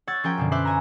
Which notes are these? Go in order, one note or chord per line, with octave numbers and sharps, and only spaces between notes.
C#5 F#5 E6 G#6 A6
F3 C#4 A#4 G5
F#2 B2 D3
B4 C5 E5 D6 E6 F#6
C#5 G#5 A#5